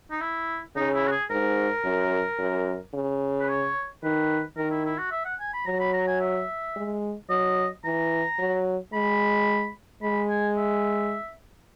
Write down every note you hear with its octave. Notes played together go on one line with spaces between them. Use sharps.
D#4
E4
C#3 D#4
E4
F#4
G#4
G#2 A#4
F#2
F#2
C#3
B4
C#5
D#3 B4
D#3 A#4
E4
E4
F#4
E5
F#5
G#5
B5
F#3 A#5
B5
A#5
G#5
E5
G#3
F#3 D#5
E3 A#5
F#3
G#3 B5
G#3 B5
G#5
E5